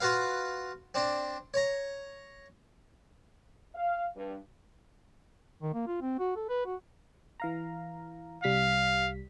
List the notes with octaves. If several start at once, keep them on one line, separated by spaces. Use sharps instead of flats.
F4 F#4 B4 F5
C4 D4
C#5 A#5
F5
G2
D#3
A#3
F4
C4
F#4
A4
B4
F#4
E3 F5 A#5
C2 G3 F5 B6